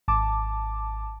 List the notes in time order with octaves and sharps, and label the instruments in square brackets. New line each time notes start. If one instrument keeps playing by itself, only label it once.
[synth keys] G#1 A5 D6